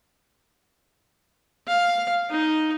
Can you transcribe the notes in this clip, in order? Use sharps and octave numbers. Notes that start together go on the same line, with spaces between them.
F5
D#4